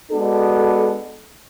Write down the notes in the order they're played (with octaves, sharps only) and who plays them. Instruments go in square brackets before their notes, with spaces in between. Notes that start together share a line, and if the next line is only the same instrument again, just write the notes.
[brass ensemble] G#3 B3 D4 F#4 A4